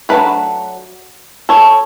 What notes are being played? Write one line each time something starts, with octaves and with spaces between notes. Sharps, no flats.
F#3 A3 D4 G4 B4
A4 C#5